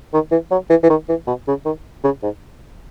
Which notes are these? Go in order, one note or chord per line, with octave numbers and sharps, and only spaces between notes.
D#3
E3
F#3
E3
E3
D#3
E3
B2
C#3
D#3
C#3
G#2